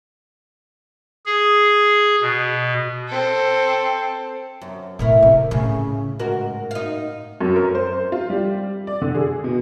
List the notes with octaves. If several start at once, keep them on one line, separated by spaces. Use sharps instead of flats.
G#4
B2
C4 A4
F#2
A2 C3 A3 E4 A#4
C3
A2 C#3
G#2 F#4 A#4
D#4 F5
F#2
A#4
C5
F4
G3
D5
D3
G#4
B2